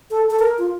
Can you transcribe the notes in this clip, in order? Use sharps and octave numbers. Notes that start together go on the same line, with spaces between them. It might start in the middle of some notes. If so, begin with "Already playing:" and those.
A4
A4
A#4
F4